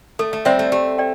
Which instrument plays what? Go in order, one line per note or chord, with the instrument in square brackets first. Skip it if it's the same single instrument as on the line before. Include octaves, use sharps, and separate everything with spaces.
[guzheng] A3 [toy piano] A4
[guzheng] A3
[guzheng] G3 C4 [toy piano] C5 E5
[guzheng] A3
[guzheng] A3 [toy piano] G4
[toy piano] D5 G5